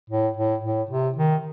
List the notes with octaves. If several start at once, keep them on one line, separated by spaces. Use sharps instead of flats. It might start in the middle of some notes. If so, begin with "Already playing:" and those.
A2
A2
A2
C3
D#3